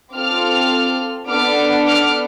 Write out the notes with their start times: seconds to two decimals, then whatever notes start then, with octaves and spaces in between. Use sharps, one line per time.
0.14 C4 F4 A4 D6 F6
1.29 B3 D4 A4 D6 F6
1.87 D6 F6